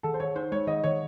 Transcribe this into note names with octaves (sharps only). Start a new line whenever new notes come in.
D#3 A4
C5
D#3 C#5
D#4 C5
G#3 C#5
D#3 D#5
D#3 C#5